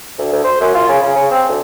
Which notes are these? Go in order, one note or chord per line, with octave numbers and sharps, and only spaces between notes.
D2
D2
C5
F#2
F4
C#3
C#3
C#3
C4
D2